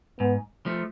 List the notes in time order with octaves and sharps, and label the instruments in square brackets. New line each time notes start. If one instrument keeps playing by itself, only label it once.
[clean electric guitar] G#2 [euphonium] B3
[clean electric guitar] F3 A3